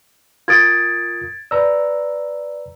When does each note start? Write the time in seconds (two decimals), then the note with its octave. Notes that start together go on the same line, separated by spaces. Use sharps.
0.48 F4 A#4 D#6 G#6 A6 D7
1.51 B4 D5 A#5 E6